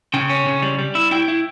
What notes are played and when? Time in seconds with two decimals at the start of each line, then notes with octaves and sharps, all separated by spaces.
0.14 C#3 G5
0.29 C#4
0.46 C#3
0.63 G3
0.79 G3
0.95 E4
1.11 E4 G5
1.28 E4